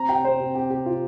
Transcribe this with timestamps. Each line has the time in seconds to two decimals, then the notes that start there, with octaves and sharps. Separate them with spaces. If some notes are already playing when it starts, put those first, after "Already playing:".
Already playing: C4 A#5
0.09 C3 G5
0.24 C4 C5
0.39 C3
0.55 C3 G4
0.70 C3 G4
0.85 C3 F4